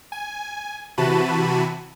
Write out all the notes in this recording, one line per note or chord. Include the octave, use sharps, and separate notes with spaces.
G#5
C3 E3 F#4 A5 B5 D#7